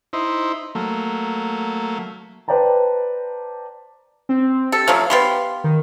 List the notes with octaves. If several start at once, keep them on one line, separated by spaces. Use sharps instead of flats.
D#4 E4 C5
F#3 A3 A#3
B4 C5 D5 G5 A5 A#5
C4
G4 A4
F3 F#3 A3 F5
B3 G4 C6
D#3